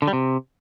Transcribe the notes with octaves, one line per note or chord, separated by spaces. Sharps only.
D3
G3
C3